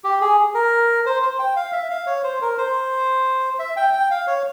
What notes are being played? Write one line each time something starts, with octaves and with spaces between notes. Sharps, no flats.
G4
G#4
A#4
C5
C5
G5
F5
E5
F5
C#5
C5
A#4
C5
E5
G5
G5
F5
C#5